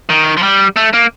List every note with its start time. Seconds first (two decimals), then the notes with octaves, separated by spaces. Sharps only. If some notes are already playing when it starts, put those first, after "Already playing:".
0.09 D#3
0.37 F3
0.43 G3
0.76 A3
0.93 A#3